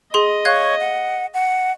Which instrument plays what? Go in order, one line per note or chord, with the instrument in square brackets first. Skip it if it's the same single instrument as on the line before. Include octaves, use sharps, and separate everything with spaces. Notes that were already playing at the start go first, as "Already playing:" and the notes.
[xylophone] G#4 C6 [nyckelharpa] D#5
[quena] C#5 [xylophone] F5 F#6 G#6
[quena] F#5
F#5